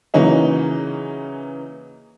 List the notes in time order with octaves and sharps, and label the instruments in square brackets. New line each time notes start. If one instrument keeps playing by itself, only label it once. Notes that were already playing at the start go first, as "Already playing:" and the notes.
[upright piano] C#3 E3 F#3 A#3 C#4 D#4